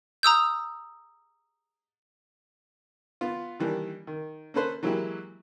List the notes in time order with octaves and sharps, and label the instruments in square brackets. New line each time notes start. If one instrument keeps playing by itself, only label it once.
[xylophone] A#5 D#6 E6 G6
[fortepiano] B3 F4
D#3 E3 G3 A#3 D4
D#3
A#3 C#4 A4 B4 C5
E3 F#3 G#3 A#3 E4 G4